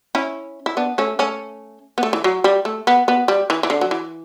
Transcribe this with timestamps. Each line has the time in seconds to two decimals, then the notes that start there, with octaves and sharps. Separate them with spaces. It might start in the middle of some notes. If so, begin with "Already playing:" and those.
0.15 C#4 E4
0.66 E4
0.77 B3 D4
0.98 A3 C#4
1.19 A3 C#4
1.98 B3
2.03 A3
2.13 E3
2.24 F#3
2.44 G3
2.65 A3
2.87 B3
3.08 B3
3.28 G3
3.50 E3
3.63 E3
3.70 D3
3.81 F#3
3.91 E3